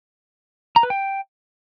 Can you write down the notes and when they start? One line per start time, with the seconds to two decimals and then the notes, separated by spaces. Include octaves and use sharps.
0.76 A#5
0.83 B4
0.90 G5